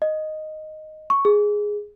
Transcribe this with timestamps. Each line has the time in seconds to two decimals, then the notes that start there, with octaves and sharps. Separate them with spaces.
0.02 D#5
1.10 C#6
1.25 G#4